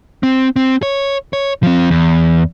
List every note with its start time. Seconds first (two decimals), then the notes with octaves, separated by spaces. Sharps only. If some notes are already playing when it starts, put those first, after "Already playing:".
0.23 C4
0.56 C4
0.83 C#5
1.33 C#5
1.63 F3 C4
1.90 E2